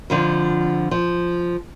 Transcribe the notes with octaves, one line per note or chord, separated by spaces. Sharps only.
F2 D3 F3
F3